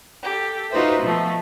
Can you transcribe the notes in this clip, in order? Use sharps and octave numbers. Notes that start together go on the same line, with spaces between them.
G4 A4
D#4 F4 F#4 B4 C5 E5
B2 F3 A3